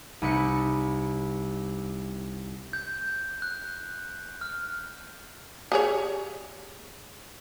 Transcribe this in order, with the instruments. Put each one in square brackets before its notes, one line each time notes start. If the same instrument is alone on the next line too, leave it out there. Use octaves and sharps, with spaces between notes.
[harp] C2 D#4 B4 C#7
[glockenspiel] G6
F#6
F6
[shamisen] G4 G#4 C#5